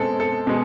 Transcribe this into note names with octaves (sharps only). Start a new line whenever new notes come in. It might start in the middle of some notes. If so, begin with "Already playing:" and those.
Already playing: B2 G#3 C4 A4
A4
B2 G#3